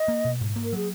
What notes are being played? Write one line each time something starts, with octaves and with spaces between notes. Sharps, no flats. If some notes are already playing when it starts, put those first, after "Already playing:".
Already playing: D#5
A#3
B2
G#2
A#3
A#4
F#3 G#4